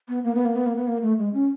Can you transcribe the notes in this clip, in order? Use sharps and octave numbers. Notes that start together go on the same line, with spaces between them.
B3
A#3
B3
A#3
B3
A#3
B3
A#3
A3
G#3
C#4